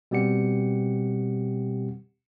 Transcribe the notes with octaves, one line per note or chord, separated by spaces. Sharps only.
B2 G3 C4 G4 F#5 C#7